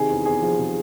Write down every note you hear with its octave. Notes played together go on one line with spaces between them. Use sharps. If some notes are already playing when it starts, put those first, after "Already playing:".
Already playing: C3 D#3 G#4
E2
E2 G#4
F3
C3